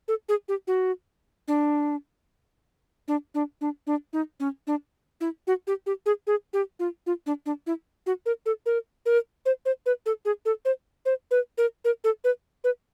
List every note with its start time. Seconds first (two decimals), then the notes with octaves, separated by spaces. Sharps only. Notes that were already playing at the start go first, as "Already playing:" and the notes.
0.08 A4
0.29 G#4
0.48 G4
0.67 F#4
1.48 D4
3.08 D4
3.34 D4
3.61 D4
3.87 D4
4.13 D#4
4.40 C#4
4.67 D4
5.21 E4
5.47 F#4
5.67 G4
5.86 G4
6.06 G#4
6.27 G#4
6.53 G4
6.79 F4
7.06 F4
7.26 D4
7.46 D4
7.67 E4
8.06 F#4
8.26 A#4
8.46 A4
8.66 A#4
9.06 A#4
9.46 C5
9.65 C5
9.86 B4
10.06 A4
10.25 G#4
10.45 A4
10.65 C5
11.06 C5
11.31 B4
11.58 A#4
11.85 A#4
12.04 A4
12.24 B4
12.64 B4